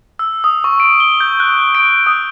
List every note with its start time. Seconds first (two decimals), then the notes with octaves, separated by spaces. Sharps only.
0.19 E6
0.44 D#6
0.64 C#6
0.80 D7
1.00 G7
1.20 G6
1.40 F#6
1.75 D7
2.06 D#6